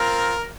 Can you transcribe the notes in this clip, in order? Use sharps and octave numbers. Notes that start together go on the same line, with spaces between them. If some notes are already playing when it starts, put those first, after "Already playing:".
Already playing: C4 F4 A#4